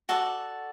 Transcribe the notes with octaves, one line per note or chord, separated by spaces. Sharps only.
F#4 A4 D5